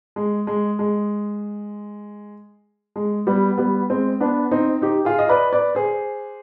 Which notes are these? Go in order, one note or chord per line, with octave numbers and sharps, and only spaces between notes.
G#3
G#3
G#3
G#3
G3 B3
G3 B3
G#3 C4
B3 D4
C4 D#4
D#4 G4
F4 G#4
D#5
B4 D5
B4 D5
G#4 C5